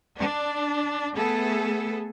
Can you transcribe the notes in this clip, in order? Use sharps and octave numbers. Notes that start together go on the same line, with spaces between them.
D4
A3 B3 G#4 A4